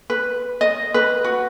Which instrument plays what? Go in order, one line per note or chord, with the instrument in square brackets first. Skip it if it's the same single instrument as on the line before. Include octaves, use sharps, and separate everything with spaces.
[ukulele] B4
D#5
B4
F#4